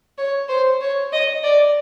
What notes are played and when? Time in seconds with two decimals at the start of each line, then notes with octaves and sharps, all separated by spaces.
0.18 C#5
0.49 C5
0.81 C#5
1.12 D#5
1.43 D5